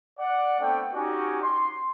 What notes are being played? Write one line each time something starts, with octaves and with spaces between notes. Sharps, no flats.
D5 F#5
A3 B3 C4 D4 G5
C#4 D#4 F#4 G4 D5 G#5
C6